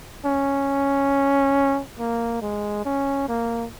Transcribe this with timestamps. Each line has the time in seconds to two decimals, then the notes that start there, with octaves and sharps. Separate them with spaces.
0.25 C#4
1.99 A#3
2.42 G#3
2.85 C#4
3.29 A#3